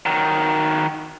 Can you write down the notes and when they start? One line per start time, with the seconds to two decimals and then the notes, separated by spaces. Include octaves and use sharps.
0.06 D#3 F#3